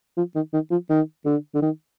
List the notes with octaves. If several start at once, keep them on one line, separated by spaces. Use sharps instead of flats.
F3
D#3
D#3
F3
D#3
D3
D3
D#3